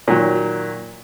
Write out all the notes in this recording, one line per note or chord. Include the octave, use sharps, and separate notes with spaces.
A#2 D#3 F#3